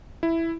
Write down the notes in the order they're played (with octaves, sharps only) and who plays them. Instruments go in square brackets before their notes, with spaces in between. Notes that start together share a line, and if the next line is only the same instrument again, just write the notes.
[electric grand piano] E4